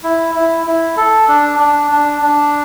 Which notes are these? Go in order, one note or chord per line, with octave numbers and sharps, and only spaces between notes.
E4
E4
E4
A4
D4
D4
D4
D4